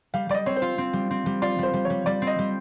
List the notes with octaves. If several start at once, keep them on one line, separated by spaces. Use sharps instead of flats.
G3 F5
G3 D5
D#5
C4 C#5
C5
F4
C4
G3
C4
G3
F4 D5
G3 C5
G3
G3 C#5
G3 D5
C4
D#5
G3